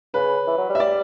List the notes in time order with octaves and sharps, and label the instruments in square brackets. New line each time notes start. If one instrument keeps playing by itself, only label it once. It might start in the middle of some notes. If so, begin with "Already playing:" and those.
[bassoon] C#3 [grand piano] B4
[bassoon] E3
F#3
G3
[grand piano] E5
D5